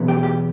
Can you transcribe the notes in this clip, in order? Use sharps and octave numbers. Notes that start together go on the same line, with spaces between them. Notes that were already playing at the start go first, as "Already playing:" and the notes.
Already playing: E2 B2 F#3 B3
G4
G4